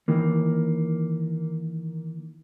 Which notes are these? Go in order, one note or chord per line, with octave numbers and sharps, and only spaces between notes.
D#3 E3 A#3